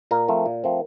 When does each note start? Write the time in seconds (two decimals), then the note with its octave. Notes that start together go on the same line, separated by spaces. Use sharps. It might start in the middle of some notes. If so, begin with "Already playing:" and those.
0.11 A#2 A#4
0.28 F3 A3 C4
0.46 A#2
0.64 F3 A3 C4